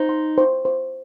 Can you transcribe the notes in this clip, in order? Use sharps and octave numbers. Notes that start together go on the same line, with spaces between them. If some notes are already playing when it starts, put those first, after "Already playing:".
Already playing: D#4 C5
C6
C5
C5